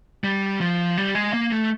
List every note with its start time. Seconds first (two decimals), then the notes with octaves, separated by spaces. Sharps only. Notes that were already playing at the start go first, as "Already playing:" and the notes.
0.24 G3
0.61 F3
0.98 G3
1.15 G#3
1.33 A#3
1.52 A3